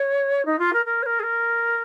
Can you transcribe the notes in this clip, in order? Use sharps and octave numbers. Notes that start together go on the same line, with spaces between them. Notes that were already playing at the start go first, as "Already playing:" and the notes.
Already playing: C#5
D#4
F4
A#4
A#4
C#5
A#4
G#4
A#4